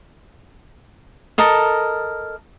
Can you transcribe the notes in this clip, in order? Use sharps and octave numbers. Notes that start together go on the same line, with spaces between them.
A4 A#4 D#5